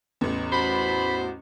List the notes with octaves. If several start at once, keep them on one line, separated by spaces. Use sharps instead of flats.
A1 E2
F#4 C5 B5